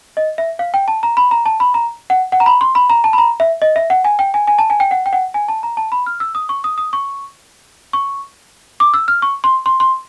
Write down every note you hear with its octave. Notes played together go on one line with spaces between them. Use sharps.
D#5
E5
F5
G5
A5
A#5
B5
A#5
A5
B5
A#5
F#5
F#5
A#5
B5
C6
B5
A#5
A5
B5
A#5
E5
D#5
E5
F#5
G#5
G5
G#5
G#5
A5
G#5
G5
F#5
G5
F#5
G#5
A5
A#5
A5
B5
F6
E6
D#6
C#6
D#6
D#6
C#6
C#6
D6
E6
F6
C#6
C6
C6
C6